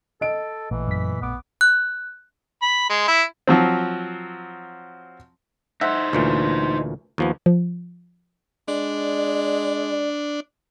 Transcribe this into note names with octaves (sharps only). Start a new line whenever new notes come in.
A4 D#5 D7
A1 A#2 E3 A3
F#2 B6
A#1 B3 D6
F#6
B5
G#3
E4
F3 F#3 C4
D#4 C5 E5 F#5
D2 A#2 E3
D#2 F3 B3
F3
G#3 D4 D5